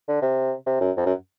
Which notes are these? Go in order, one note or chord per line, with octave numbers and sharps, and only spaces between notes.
D3
C3
C3
F#2
F2
F#2